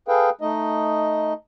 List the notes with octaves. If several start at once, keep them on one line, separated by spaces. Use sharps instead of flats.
G#4 A4 B4 F5 G5
A3 D#4 D#5